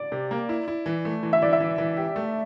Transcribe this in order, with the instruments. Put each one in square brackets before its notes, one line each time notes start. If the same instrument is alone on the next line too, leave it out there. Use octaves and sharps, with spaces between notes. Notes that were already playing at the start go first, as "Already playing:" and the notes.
Already playing: [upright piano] D5
[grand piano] C3
A#3
E4
E4
E3
A3
E3
[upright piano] E5
[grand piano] E3 [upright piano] D5
[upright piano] E5
[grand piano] E3
E3
G4
A3